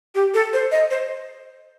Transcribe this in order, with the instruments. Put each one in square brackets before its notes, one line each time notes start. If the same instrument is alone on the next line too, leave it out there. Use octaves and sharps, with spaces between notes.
[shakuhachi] G4
A4
C5
D#5
C5